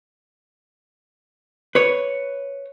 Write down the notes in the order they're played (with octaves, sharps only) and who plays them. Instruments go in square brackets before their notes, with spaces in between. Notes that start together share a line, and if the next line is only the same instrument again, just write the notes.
[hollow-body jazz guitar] B4 C#5